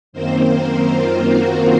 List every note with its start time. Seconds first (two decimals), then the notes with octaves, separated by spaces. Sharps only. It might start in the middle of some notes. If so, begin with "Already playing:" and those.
0.13 F#2 D#3 A#3 C4 C5
0.51 A#3 A#4
0.91 F4
1.30 F#4